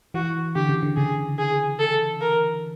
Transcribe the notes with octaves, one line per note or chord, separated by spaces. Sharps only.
E3 F#4
D3 G4
C#3
D3
C#3 G#4
G#4
A4
A#4